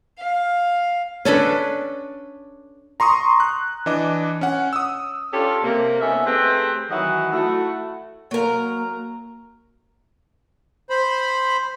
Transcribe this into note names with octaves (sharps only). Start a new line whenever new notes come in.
F5
C#4 D4 A4 B4
A#5 C6 C#6 D#6
F#6
E3 D4 D#5 D6
C#4 F#5
D#6 E6
C#4 D4 F4 G4 A4
C3 A#3
B3 C#4 D#4 A4 E5
A3 C4 G4 G#4 B4
D#3 E3 F#3 D#5 E5 F#5
A3 E4 F#4
F#3 A#3 A#4
C5 B5